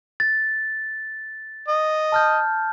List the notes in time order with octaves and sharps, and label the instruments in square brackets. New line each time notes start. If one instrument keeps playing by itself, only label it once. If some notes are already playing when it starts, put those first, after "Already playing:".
[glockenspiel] A6
[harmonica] D#5
[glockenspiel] A5 F6 G6